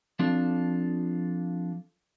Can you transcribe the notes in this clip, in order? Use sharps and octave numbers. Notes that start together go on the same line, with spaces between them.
F3 C4 D4 F4 A4